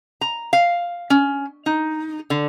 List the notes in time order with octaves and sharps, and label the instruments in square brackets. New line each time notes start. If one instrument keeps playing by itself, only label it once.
[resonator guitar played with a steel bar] A#5
F5
C#4
D#4
D3